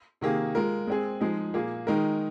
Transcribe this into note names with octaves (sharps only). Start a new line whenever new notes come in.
C3 D#3 A#3 G#4
G#3 F4 A#4
G#3 C4 G#4
F3 G#3 D#4 G#4
A#2 A#3 G#4
D#3 G#3 D#4 A#4